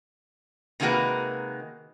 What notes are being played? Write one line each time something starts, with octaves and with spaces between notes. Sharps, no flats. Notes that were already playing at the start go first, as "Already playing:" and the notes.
C3 D#3 G#3 A#3 F#4 B4